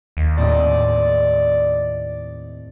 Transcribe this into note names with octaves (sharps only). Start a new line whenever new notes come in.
D#2
A2 C4 D5 D#5